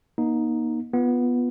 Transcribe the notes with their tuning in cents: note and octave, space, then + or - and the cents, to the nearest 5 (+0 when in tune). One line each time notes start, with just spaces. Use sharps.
A#3 +40 D#4 +0
B3 -10 F4 +0